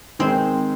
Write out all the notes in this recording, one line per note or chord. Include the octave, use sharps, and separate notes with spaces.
D#3 G#3 C4 D#4 G#4 C5